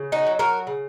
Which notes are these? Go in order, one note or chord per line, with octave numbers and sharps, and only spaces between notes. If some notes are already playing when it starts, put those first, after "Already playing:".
Already playing: C#3
D#4 F#4
F#3
F#4 A#4
C#3